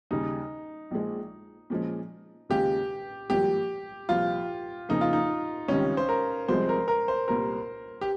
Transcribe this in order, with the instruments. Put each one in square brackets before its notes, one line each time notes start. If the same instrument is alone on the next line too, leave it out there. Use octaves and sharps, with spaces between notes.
[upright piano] D#2 C#3 G3 [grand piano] D#4
[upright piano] A#1 A#2 F3 G#3
A#2 F3 G#3 C#4
[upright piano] D#2 C#3 G#3 C#4 F4 [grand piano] G4
[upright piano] G#1 G2 F3 A#3 [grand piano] G4
[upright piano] C2 A#2 F3 [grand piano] F4
[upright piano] F2 C#3 F3 A#3 [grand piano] D#4
[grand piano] F4
D#4
[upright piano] C#2 C3 D#3 G3 [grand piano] C#4
[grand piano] C5
A#4
[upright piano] C2 C3 F3 G#3 C4 [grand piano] C5
[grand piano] A#4
A#4
C5
[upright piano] C2 A#2 G3 [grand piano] A#4
[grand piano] G4